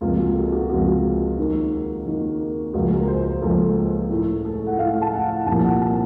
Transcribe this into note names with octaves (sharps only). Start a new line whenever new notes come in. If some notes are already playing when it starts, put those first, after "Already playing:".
C#2 C3 F3 A#3 F4
F#4
A4
F#4
C#2 C3 F3 A#3 F#4
D#2 D#3 A#3
D#2 D#3 A#3
C#2 C#3 F3 A#3 F#4
A#4
A#4
C5
C5
C#2 C#3 F3 A#3 A4
A2 A3
A4
F#5
A2 A3 F5
A5
F#5
F#5
C2 A#2 F3 A#3 A5
F#5
A5